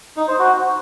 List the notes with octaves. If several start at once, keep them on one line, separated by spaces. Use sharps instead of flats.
D#4
C5
F#4